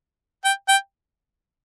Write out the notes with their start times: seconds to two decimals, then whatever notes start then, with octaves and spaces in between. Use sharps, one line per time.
0.45 G5
0.69 G5